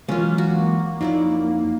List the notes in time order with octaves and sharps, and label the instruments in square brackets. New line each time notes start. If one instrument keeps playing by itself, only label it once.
[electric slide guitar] E3 F#3 G#3 [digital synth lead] A#3 [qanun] C#4 F4
[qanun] F#4
[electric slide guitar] F2 [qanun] F#3 E4 D5 [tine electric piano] D#4